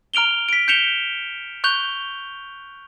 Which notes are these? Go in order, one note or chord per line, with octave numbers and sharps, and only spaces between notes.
A#5 F6 D7 F7 G7
B6 D7
G6 B6 C#7 E7 F7 G7
C#6 F#6 G6 F7 G7